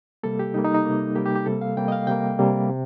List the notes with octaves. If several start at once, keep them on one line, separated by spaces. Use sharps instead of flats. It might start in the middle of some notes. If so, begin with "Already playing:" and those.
C3 G3 A#3 A4
G4
C3 G3 A#3 D#4
D#4
D#4
C3 G3 A#3
C3 G3 A#3 G4
G4
G4
C3 G3 A#3 A4
F5
C3 G3 A#3 G5
D#5
F5
C3 G3 A#3 G5
C3 G3 A#3
C3